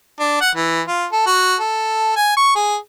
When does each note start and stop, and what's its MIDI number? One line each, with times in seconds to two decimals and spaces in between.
0.20 0.37 62
0.41 0.50 78
0.55 0.81 52
0.87 1.06 65
1.13 1.22 69
1.27 1.55 66
1.60 2.16 69
2.17 2.33 80
2.37 2.54 85
2.56 2.76 68